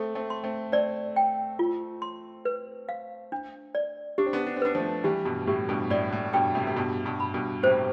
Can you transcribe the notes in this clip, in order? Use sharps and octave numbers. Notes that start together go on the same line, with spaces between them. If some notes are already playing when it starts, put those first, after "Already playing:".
Already playing: A3 C4 A4
A3 C4
C6
A3 C4
A3 C4 D5
G5
F4
C6
B4
F5
D4
D5
D4 G4
C4
B3 D4
D4
C4
B3 D4 B4
F3 A3
E3 G3 G4
G2 B2
A2 G4
G2 B2
A2 D5
A2
G2 B2 G5
A2 C3
C3
G2 B2 G4
G2 B2
B5
G2 B2
A2 C3 C5